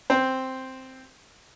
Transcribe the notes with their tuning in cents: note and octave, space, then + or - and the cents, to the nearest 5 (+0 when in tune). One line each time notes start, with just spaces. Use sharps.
C4 +0 C5 +0